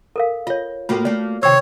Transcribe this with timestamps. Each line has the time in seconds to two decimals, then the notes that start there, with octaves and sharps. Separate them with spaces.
0.16 A4 A#4 F5
0.47 F4 C#5 D#5
0.89 A2 A#3 F4 F#4 A4
1.05 A3 A#3 D5
1.43 C3 D#3 C5 C#5 G5 E6